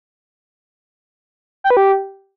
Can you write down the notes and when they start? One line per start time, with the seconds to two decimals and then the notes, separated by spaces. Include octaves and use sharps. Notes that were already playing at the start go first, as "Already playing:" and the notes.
1.64 G5
1.70 B4
1.77 G4